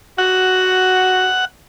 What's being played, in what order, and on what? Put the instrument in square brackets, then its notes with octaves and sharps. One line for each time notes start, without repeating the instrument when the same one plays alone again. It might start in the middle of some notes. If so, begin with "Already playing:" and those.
[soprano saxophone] F#4 [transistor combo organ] F#5